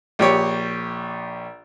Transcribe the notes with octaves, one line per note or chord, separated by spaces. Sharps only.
A#1 G4 C#5